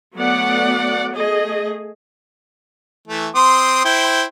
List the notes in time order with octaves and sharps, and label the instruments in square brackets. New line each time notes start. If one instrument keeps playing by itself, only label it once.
[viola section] F#3 A3 B3 D5 F#5
A3 G#4 D#5
[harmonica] E3 A3
C4 C6 D#6
E4 C5 G5